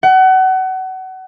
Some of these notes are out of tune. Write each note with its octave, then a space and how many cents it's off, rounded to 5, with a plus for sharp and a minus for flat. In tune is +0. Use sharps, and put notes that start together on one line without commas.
F#5 +30